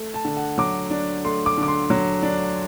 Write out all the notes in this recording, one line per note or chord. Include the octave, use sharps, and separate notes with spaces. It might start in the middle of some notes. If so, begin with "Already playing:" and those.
Already playing: A3
A5
D3
F#5
F#3 D6
D4
A3 C6
D6
D3
D6
C6
F#3
D4